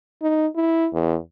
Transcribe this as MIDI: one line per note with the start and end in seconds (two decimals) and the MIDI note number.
0.22 0.47 63
0.56 0.88 64
0.93 1.17 40